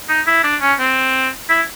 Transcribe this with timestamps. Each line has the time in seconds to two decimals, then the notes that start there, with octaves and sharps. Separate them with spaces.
0.09 D#4
0.27 E4
0.44 D4
0.61 C#4
0.79 C4
1.49 E4